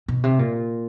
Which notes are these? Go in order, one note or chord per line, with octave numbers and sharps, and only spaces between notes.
B2
C3
A#2